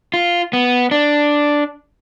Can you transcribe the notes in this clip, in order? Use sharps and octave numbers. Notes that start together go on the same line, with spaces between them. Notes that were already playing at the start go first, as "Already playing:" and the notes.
F4
B3
D4